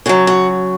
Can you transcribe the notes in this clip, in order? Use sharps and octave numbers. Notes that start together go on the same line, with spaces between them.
C#3 F#3 F#4
F#4